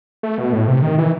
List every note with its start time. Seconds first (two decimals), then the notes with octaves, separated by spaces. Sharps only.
0.23 A3
0.38 B2
0.53 A2
0.68 C3
0.82 D#3
0.98 E3